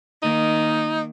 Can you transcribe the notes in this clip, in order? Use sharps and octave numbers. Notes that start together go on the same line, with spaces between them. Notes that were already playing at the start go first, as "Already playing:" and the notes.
D#3 A#3 D#4